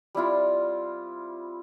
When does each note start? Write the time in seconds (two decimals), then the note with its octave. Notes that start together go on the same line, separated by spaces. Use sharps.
0.15 G3 C4 E4 F4